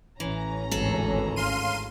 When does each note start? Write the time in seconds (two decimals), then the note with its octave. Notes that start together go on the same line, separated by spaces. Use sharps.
0.20 A1 E3 C#4 A#5
0.71 G#1 D2 E3 G#4 A4
1.36 F5 C6 D#7